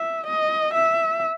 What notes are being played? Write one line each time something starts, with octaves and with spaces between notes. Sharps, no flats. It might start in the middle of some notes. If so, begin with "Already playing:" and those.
Already playing: E5
D#5
E5